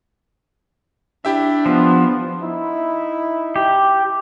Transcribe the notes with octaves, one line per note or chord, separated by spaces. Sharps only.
D4 E4 G4 E5
F3 B3
D#4 E4
G4